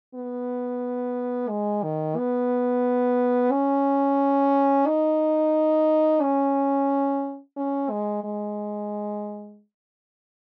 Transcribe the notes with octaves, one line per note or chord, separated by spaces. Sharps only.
B3
G#3
D#3
B3
C#4
D#4
C#4
C#4
G#3
G#3